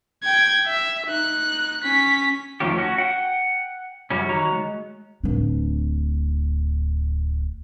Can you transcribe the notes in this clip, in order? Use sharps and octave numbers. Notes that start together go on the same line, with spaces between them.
G5 G#6
E5
D#4 F#6
C#4 B6
E2 D#3 F3 A3 C#4 G4
C#4 F#4
F#5 G5
F#2 G3 C#4
D#3 F#4 C#5 A#5
G#3
D1 D4